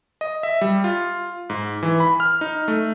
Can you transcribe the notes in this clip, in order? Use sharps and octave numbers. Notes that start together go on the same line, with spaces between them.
D#5
E5
G3
F4
G#2
E3
B5
F6
D#4
A3